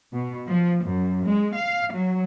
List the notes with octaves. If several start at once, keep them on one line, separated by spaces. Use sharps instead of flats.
B2
F3
F#2
G#3
F5
F#3